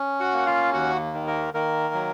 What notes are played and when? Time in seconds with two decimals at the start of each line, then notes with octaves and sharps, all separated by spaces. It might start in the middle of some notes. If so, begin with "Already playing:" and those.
Already playing: C#4
0.20 F#4 F#5
0.33 A#3 F#5
0.46 F4 F5
0.73 D#2 F#4 F#5
1.13 D#3
1.27 A#3 A#4
1.54 D#3 A#3 A#4
1.94 F#3